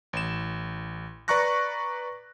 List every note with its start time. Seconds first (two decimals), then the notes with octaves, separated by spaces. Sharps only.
0.13 A1 E7
1.28 B4 D5 A#5 C#6 F#6 A#6